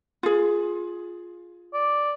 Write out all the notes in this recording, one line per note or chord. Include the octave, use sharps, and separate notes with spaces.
F4 G#4
D5